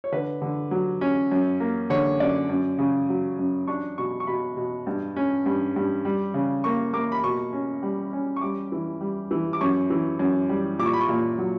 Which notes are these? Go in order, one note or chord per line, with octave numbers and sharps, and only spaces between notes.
C#5
D3 B4
D3
F#3
C#4
F#2
A#3
D3 C#5
F#2 D5
F#2
C#3
F#3
F#2
D4 C#6
B2 C#6
C#6
B2 B5
B2
G2
C#4
G2
G2
G3
C#3
A#3 C#6
A#3 D6
B5
B2 C#6
C#4
G3
C#4
C#6
G3 D6
E3
G3
E3
D6
F#2 C#6
E3
F#2
G3
A#2 D6
C#6
B5
C#6
A#2
F#3